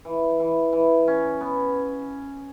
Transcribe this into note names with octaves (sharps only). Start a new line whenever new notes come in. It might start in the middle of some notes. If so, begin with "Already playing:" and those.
E3
E3
E3
C#4
B3